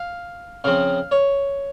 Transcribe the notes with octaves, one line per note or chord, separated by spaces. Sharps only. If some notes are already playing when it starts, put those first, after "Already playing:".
Already playing: F5
C#3 F3 C4 F5
C#5